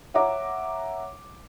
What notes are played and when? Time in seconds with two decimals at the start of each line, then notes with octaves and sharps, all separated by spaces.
0.14 C#5 E5 F#5 A#5 D6